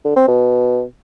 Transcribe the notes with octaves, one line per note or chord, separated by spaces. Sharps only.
D3
C4
B2